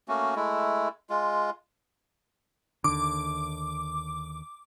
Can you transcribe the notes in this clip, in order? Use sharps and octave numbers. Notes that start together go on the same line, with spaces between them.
A3 A#3 C#4 F#4
G#3 A3 E4
G#3 F4
D#2 D3 D6